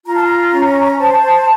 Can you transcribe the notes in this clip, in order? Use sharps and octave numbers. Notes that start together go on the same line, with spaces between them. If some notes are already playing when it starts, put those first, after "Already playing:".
F4 A#5
A5
A#5
C#4
C5 A5